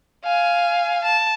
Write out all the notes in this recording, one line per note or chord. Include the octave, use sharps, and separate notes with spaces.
F5 G#5
A5